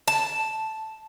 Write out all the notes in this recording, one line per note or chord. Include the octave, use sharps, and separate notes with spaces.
A5